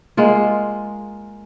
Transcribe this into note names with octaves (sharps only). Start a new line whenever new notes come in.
G#3 A#3 F4